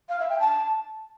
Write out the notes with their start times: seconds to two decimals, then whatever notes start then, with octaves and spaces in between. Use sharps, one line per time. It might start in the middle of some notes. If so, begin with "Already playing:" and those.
0.09 F5
0.19 E5
0.29 G5
0.40 A5